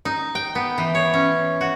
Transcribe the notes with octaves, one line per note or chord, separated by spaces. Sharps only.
D#4
G5
B3
E3
C#5
C#4
F#4